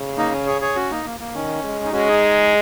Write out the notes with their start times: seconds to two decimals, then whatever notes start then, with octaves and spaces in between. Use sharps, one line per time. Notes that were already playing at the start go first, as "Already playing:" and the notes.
Already playing: C#3
0.17 A#3 D#4
0.32 C#4
0.46 G#4 C#5
0.61 G#4 C#5
0.76 C#4 F#4
0.91 A#3 D#4
1.05 A#3
1.20 A#3
1.34 D#3 C#4
1.64 G#3
1.85 D#4
1.93 G#3 C#4 F#4
2.07 D#4 G#4